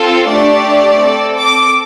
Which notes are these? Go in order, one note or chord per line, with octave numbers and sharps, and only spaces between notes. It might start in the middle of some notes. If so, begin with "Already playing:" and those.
Already playing: C4 F4 A4
A3 D4 G4 D5
C4 A4
D6